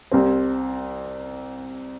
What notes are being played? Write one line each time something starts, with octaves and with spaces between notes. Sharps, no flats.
C2 C3 G3 C4